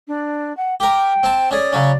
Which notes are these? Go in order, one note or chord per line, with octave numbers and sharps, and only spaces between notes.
D4
F#5
G4 A#4 G5
C4 A5
C#4 G#4 D5
C#3 F#3 C#4